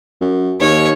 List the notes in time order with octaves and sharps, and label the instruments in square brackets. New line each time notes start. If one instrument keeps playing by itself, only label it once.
[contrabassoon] F#2
[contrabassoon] D#2 [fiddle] C#5